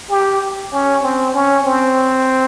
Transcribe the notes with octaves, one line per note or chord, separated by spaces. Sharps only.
G4
C#4
C4
C#4
C4